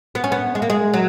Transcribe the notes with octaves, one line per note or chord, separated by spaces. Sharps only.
B3
C#4
B3
G#3
A#3
G#3
F#3